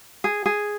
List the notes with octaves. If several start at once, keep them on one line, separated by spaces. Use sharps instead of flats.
G#4
G#4